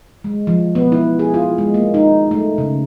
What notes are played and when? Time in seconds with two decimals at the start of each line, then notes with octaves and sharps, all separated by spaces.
0.24 G#3
0.47 F3
0.75 B3
0.92 E4
1.19 G#4
1.34 F4
1.58 G#3
1.74 A#3
1.94 D#4
2.31 A3
2.58 C#3